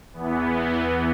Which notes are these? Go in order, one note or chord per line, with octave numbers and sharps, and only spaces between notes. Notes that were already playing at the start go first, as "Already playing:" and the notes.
E2 E3 B3